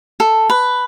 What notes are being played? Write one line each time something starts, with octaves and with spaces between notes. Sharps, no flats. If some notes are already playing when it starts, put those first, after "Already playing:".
A4
B4